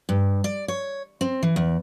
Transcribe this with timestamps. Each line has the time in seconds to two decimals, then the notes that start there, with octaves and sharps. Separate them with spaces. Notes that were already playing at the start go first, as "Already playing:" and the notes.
0.09 G2
0.44 D5
0.68 C#5
1.21 C4
1.43 E3
1.56 E2